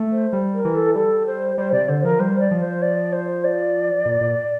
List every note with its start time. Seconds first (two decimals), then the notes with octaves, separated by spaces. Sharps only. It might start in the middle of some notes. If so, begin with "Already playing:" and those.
Already playing: A3
0.12 C5
0.33 G3
0.54 A#4
0.65 E3
0.75 A4
0.95 G3 A4
1.26 C5
1.57 G3 C5
1.72 C3 D5
1.89 D3 C5
2.04 F3 A#4
2.20 G3 C5
2.40 D5
2.51 F3
2.60 C5
2.82 D5
3.13 C5
3.44 D5
4.06 A#2
4.21 A#2